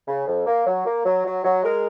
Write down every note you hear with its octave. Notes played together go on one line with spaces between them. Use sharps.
C#3
F2
A#3
F#3
A#3
F#3
F#3
F#3
G#3 A#4